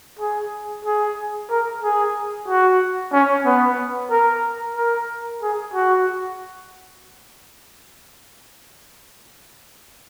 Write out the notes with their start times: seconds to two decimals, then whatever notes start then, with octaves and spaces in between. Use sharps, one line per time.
0.19 G#4
0.85 G#4
1.51 A#4
1.82 G#4
2.48 F#4
3.13 C#4
3.45 B3
4.11 A#4
4.76 A#4
5.42 G#4
5.74 F#4